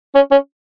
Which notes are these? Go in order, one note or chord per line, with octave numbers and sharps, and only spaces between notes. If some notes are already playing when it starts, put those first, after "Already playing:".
C#4
C#4